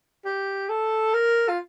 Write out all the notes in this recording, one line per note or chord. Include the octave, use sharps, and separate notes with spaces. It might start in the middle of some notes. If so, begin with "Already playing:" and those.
G4
A4
A#4
F4